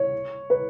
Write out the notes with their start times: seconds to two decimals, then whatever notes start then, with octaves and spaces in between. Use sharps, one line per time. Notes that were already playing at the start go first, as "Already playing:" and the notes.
Already playing: C#5
0.50 B4